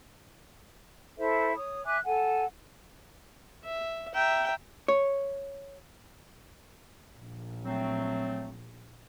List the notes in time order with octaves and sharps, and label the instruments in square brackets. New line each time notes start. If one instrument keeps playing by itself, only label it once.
[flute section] E4 A4 C5 E5
C#5 D#6
E5 G#5 D6 F#6
A4 F#5 G#5
[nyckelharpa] E5
[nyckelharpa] E5 A#5 [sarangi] G5
[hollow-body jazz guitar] C#5
[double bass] A#1
[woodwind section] F#3 A3 C4